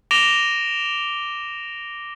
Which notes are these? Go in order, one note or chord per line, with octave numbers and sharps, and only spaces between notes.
D6 A#6 D7 E7 F7 G7